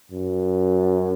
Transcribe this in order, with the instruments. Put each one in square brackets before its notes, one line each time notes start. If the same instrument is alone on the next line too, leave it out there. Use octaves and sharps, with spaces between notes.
[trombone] F#2